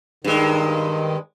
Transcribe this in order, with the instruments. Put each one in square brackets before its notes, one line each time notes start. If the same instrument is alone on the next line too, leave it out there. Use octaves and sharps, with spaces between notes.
[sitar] G2 G#3 [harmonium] D#3